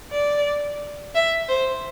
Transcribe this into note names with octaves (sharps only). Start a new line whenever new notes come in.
D5
E5
C5